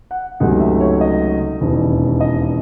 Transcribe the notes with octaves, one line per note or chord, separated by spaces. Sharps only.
F#5
C#2 C3 F#3 A3 D#4 F#5
E5
C#5
D#5
E1 D#2 C#3 E3
D#5